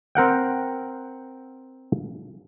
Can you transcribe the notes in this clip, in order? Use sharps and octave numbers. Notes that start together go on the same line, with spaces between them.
C4 A#4 F#5 G5